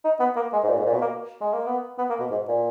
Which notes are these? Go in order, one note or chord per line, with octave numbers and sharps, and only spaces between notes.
D#4
B3
A#3
G#3
G#2
A#2
G#2
A#2
B2
A#3
G#3
A#3
B3
B3
A#3
B2
G#2
A#2